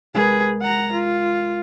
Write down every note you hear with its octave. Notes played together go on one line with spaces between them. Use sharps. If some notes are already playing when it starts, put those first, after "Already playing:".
C2 G#3 G#4 A#4 B4
F#5 A#5
F4